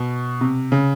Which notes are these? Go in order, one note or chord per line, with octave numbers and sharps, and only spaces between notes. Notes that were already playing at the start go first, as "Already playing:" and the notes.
Already playing: B2
C3
C#3